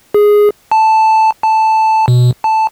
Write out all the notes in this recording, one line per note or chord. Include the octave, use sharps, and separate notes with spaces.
G#4
A5
A5
B2
A5